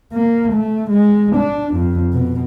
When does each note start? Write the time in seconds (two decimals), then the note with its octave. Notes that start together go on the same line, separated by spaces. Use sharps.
0.13 A#3
0.53 A3
0.91 G#3
1.36 D4
1.74 F2
2.13 B2